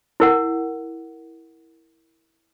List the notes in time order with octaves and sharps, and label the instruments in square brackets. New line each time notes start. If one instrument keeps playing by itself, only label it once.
[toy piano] E4 A#4 F#5